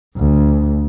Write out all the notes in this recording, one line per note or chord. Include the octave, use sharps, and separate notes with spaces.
D2